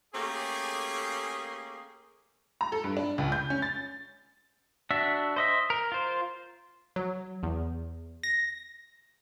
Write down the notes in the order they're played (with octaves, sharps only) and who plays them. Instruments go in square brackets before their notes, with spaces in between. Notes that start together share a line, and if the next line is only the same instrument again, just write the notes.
[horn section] A3 A#3 C#4 G4 G#4
[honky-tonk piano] A#5
A4
G2
D4
C#2
G6
C#4
A6
[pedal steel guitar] D4 F#4 E5
C5 D#5 E5
A#4
F4 C5
[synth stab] F#3
E2
A#6